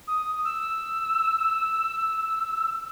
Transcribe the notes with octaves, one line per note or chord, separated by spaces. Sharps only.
D#6
E6